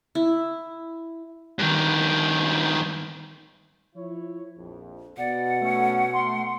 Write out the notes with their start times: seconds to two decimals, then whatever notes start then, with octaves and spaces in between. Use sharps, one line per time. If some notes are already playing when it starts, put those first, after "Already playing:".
0.15 E4
1.59 G2 D#3
3.95 F3 E4 C#5
4.56 A#1 F2
5.17 B2 D5 F#5
5.61 A3 C#4
6.13 C6